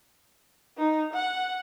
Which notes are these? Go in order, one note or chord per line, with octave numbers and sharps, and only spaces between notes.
D#4
F#5